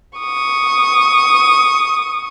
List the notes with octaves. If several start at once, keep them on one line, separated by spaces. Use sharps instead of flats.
C#6 D#6